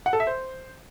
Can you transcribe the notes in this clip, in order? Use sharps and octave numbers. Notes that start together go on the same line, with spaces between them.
F#5
A4
E5
C5